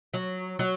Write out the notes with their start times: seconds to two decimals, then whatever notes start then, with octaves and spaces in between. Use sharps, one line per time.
0.14 F#3
0.59 F#3